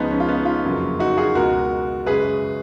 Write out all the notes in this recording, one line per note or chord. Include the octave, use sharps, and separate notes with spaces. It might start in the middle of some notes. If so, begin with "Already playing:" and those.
Already playing: C#2 C#3 F3 B3 D#4
C#4
F4
B3 D#4
C#4 F4
F#1 F2 C#3 F#3 A#3
D#4 F#4
F4 G#4
C#2 B2 G#3 F#4 A#4
F#2 C#3 G#3 G#4 B4